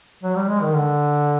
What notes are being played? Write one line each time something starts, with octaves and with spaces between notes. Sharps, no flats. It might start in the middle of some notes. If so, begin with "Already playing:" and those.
F#3
G3
G#3
D#3
D3